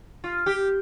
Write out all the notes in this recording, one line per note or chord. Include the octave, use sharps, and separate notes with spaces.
F4
G4